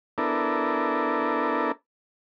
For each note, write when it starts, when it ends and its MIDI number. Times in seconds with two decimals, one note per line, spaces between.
0.18 1.72 59
0.18 1.72 62
0.18 1.72 64
0.18 1.72 69
0.18 1.72 70